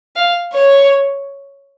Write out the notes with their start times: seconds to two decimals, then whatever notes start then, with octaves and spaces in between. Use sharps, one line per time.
0.16 F5
0.54 C#5